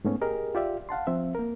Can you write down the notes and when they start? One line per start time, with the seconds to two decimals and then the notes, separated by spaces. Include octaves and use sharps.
0.04 G#2 A3 B3 C#4
0.21 G4 G#4 A#4 D#5
0.55 F4 G4 D5 E5
0.89 F5 F#5 A5 C6
1.07 F3 C4 E5
1.35 A#3 A#4